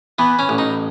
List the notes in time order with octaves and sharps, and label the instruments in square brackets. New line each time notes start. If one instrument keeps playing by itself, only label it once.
[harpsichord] E3 B3
C#4
A1
D#4